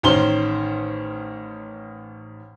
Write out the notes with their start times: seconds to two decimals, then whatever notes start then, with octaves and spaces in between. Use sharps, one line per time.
0.03 A1 D#3 C#4 C5 C6 G7